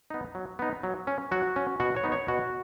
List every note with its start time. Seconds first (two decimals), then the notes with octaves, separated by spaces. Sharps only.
0.10 B3 D#4
0.35 F#3
0.59 B3 D#4
0.83 F#3
1.07 C#4
1.31 F#3 F#4
1.56 C#4
1.80 B2 F#4
1.96 C#5
2.04 B3 D#4
2.12 C#5
2.28 B2 F#4